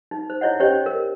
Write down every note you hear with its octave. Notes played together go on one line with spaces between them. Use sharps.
D#4
C5
E4 C#5 D#5 F#5
C#4 G4 C5 C#5 D#5
A#4